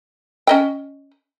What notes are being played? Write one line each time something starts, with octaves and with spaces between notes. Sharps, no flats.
C#4 D#5 G5